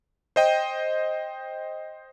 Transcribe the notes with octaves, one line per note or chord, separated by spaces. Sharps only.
C5 D#5 G5